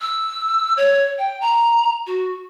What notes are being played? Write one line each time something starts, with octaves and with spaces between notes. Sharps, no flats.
E6
C#5
G5
A#5
F#4